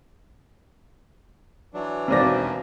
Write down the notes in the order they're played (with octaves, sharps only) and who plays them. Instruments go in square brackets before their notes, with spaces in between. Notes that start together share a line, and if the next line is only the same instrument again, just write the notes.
[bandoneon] E3 F#3 D4
[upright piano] E1 D#2 A#6 [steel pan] C4 D5